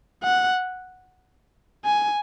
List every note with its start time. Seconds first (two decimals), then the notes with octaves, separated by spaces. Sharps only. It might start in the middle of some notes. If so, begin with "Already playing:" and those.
0.24 F#5
1.85 G#5